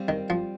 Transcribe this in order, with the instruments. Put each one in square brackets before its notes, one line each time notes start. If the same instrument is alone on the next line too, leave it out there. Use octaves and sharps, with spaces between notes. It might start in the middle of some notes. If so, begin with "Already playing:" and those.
Already playing: [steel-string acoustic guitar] G3 C4 F4
[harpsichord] D#3
F3